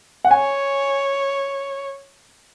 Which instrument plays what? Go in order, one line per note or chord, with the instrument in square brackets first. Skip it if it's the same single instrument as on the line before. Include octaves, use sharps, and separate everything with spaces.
[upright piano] F#5
[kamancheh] C#5 [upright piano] G#5